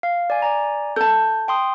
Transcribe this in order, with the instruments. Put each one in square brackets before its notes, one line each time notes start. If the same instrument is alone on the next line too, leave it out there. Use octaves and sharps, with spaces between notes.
[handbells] F5
D5 G#5
D5 G#5 A#5
[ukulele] A4 A5 [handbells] G6
[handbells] G5 C6 D#6